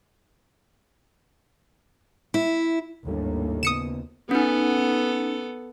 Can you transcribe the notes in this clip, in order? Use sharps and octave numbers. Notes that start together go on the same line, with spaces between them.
E4
G#1 D#2 A2 G3 D4
C#3 B3 D#6 C#7 E7
B3 C#4 D#4 A4